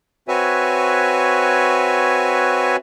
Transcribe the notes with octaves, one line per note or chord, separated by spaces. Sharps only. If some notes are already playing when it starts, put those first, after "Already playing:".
C4 F#4 B4 C#5 E5 G#5